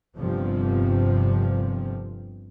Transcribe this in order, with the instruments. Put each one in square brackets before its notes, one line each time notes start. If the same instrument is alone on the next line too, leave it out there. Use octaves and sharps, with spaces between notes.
[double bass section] G1 G2 C3 F3